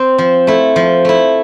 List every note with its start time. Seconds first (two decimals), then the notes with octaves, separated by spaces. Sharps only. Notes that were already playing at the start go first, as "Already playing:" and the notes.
Already playing: C4
0.18 F3
0.47 A3 E4
0.76 F3
1.05 A3 E4